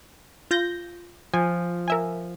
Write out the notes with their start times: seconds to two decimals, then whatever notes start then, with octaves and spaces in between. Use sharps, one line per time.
0.51 F4 G6 A#6
1.34 F3 G#5
1.88 A#4 E5 G#5